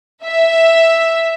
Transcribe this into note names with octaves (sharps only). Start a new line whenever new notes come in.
E5